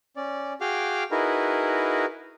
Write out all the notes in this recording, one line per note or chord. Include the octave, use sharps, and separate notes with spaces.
C#4 D5
F#4 G#4 F5 G5 D6 F6
D#4 E4 F#4 G#4 A#4 B4